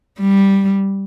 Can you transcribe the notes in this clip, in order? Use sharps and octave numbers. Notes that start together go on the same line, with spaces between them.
G3